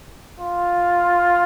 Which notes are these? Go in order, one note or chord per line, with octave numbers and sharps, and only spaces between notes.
F4